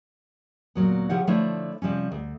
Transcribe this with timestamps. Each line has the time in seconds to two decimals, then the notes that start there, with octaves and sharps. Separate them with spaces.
0.75 D2 A#2 F#3 B3
1.09 C#3 F3 E4 G4 C#5 F#5
1.27 D3 F3 A3 D4 E4 C#5
1.82 C3 F3 G3 C#4
2.12 D2